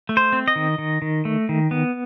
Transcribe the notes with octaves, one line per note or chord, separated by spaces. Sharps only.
A3
C5
C4
D#5
D#3
D#3
D#3
A3
D#3
B3